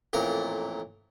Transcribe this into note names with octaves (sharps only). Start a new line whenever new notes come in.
A1 F2 A#2 A#4